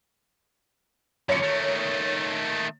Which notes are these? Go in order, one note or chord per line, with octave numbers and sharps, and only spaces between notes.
F#2 D3 C#5 C#7
D#3 A3